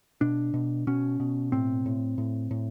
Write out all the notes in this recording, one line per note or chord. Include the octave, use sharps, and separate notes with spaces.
B2 D4
B2
B2 C#4
B2
A2 C4
A2
A2
A2